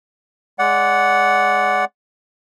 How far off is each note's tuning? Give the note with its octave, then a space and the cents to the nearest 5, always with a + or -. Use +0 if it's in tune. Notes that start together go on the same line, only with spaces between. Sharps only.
G#3 +0 D5 -20 F#5 +0